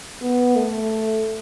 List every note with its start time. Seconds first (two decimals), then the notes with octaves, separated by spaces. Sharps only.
0.21 B3
0.56 A3